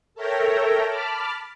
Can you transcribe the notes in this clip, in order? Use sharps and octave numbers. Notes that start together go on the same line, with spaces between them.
A4 A#4 C#5 E5 G5 A#5
A5 B5 D6 F6